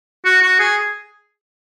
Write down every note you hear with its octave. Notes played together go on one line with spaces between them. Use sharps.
F#4
F#4
G#4